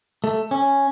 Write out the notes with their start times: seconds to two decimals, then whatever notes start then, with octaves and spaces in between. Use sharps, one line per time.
0.24 A3
0.51 C#4